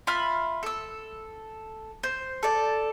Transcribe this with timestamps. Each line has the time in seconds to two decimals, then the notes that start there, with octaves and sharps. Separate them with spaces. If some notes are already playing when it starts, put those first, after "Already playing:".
0.07 F4 E5 B5 F6
0.63 A4 E6
2.03 C5
2.43 A4 D5